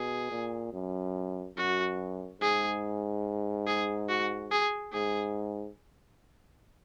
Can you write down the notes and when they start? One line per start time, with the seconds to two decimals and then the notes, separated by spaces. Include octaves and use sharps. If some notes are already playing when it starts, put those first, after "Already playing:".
Already playing: B2 G#4
0.31 A#2
0.73 F#2
1.57 F#2 F#4
2.41 G#2 G#4
3.67 G#4
4.09 F#4
4.51 G#4
4.93 G#2 G#4